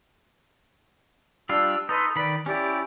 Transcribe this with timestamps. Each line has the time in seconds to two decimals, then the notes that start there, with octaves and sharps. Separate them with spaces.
1.49 G3 D4 F4 E6
1.89 D#4 A4 B4 D#5 C6
2.16 D#3 B4 D5 B5
2.46 C#4 E4 G4 D5